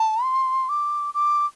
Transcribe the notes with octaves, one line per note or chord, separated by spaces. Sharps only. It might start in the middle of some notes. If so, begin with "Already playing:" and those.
Already playing: A5
C6
D6
D6